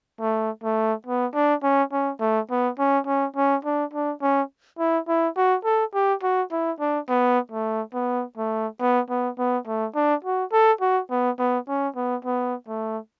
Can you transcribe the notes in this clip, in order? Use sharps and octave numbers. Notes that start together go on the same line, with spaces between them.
A3
A3
B3
D4
C#4
C#4
A3
B3
C#4
C#4
C#4
D4
D4
C#4
E4
E4
F#4
A4
G4
F#4
E4
D4
B3
A3
B3
A3
B3
B3
B3
A3
D4
F#4
A4
F#4
B3
B3
C#4
B3
B3
A3